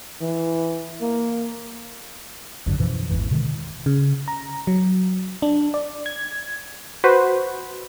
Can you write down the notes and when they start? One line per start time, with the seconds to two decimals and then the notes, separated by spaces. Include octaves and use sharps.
0.21 E3
1.01 A#3
2.66 G#1 C#2 F#2 D3
2.79 F#2 B2 E3 F3
3.09 G#1 E2 E3
3.31 B2 D3 D#3 G#3
3.86 C#3
4.28 A#5
4.67 F#3
5.42 D4
5.74 D5
6.06 G#6
7.04 F#4 B4 C5